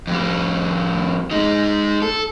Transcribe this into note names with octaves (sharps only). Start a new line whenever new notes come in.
F2 G3
G#3 D#4
A4